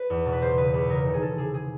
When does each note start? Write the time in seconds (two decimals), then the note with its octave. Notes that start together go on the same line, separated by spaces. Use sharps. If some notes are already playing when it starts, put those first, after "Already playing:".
Already playing: B4
0.10 E2
0.26 B2
0.33 B4
0.42 C#2 C5
0.58 C#3 B4
0.74 C#2 B4
0.89 C#3 A#4
1.06 D#3
1.14 G#4
1.21 D#3 A4
1.38 C3 G#4
1.54 G#4